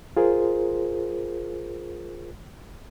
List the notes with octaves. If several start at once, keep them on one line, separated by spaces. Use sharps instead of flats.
F4 G#4 A#4 C5